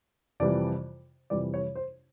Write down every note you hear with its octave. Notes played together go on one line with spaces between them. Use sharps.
F2 C3 E3 G3 D5
F2 C3 E3 G3 D5
C#5
C5